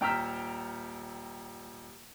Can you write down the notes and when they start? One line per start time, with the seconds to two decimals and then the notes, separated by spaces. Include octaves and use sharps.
0.01 D#1 G5 A#5 E6 F6 B6